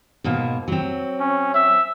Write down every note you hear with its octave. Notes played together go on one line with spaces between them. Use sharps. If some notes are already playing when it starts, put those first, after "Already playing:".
G#2 B2 A#3
F#3 C4
C#4
E5